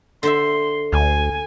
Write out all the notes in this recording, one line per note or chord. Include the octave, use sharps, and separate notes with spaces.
D3 C5 E5 C6
D2 G#5